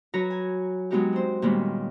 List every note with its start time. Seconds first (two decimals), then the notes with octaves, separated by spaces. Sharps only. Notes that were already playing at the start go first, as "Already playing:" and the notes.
0.14 F#3 F#4 B4 C#5 A#5
0.30 G#5
0.91 F#3 G#3 B3 D#4 F#4 G4
1.13 C4 C5
1.42 A#2 D#3 G3 G#3 B3 C#4